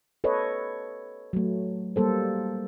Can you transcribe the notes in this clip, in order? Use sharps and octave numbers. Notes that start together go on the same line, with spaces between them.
A4 B4 C#5 D#5
F#3 A3
G3 A#3 A4 C5